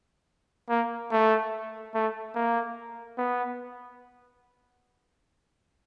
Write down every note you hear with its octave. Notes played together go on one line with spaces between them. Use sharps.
A#3
A3
A3
A#3
B3